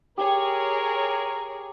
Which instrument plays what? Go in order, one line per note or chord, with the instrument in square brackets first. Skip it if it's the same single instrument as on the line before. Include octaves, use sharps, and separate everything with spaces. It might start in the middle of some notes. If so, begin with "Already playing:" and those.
[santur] G4 [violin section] G#4 C#5 [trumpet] A#4